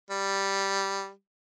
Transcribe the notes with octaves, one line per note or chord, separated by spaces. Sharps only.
G3